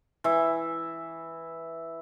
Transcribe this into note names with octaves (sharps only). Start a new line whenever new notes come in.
E3 E5